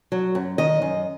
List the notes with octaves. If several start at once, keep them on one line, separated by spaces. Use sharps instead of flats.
F#3
F#2
D#3 D#5
F#2